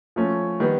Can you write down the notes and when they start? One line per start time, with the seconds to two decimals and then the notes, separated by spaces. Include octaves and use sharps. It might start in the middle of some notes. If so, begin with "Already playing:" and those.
0.16 F3 A3 C#4
0.60 D#3 G3 B3